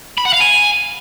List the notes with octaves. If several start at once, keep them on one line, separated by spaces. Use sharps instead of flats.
B5
F#5
F5
G#5